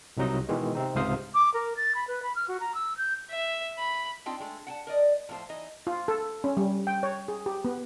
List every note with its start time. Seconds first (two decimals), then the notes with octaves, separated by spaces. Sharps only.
0.17 C2 C3 F#3 D#4 D#5
0.49 B2 D#3 E3 G#3
0.75 C3 C4 D#4
0.95 C#2 G#2 C3 C5 F5 D#6
1.34 D6
1.54 A#4
1.77 A6
1.95 B5
2.08 B4
2.23 B5
2.36 F6
2.48 F#4
2.60 A#5
2.75 E6
2.98 G6
3.30 E5
3.78 B5
4.26 C4 D4 D#4 F4 G5
4.40 G#3 A3
4.67 F#5 G5 A5
4.87 A#4 D5 D#5
5.29 A2 F3 D#4 C5
5.49 E3 D#4 D#5
5.87 F4
6.08 A4
6.44 C#4
6.57 G3
6.87 G5
7.03 C#5
7.28 G#4
7.46 G4
7.65 B3